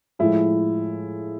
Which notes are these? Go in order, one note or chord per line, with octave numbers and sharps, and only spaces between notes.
A2 F3 G#3 E4